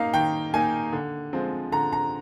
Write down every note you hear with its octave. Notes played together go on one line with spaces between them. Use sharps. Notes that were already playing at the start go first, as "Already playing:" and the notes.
Already playing: A#3 D#4 F5
D#3 G5
A#3 D#4 G#5
D3
F3 G#3 C4
D3 A#5
A#5